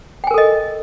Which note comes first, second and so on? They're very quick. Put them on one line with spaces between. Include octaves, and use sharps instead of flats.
G5 G#5 A#4 A4 D#5